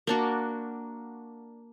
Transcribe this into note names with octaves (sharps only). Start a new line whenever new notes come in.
A#3 D4 F#4